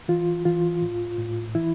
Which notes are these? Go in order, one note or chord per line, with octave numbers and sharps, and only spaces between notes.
E3 F4
E3 F4
A2
A2
E3 E4